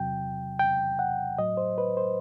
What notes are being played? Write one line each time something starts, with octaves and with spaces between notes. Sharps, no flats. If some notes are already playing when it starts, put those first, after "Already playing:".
Already playing: E2 C3 F#3 G5
G5
F#5
A2 F#3 D#5
C5
B4
C5